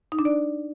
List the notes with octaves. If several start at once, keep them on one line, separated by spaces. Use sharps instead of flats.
D#4
D4
D5